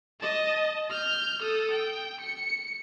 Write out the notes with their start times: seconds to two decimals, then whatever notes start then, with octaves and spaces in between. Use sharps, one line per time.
0.21 D#5 A5
0.90 F6 G6
1.43 A4 D#6
1.72 G5
2.21 C#7